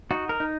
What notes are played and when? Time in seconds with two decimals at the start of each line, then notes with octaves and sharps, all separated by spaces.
0.11 D#4 F#4
0.29 A#4
0.40 D#4